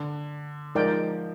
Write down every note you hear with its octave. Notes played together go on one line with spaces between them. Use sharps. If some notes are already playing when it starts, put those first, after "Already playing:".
Already playing: D3
F3 G#3 D#4 A#4 D5 G5